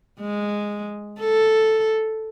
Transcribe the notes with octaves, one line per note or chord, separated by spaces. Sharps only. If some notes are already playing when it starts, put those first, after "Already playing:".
G#3
A4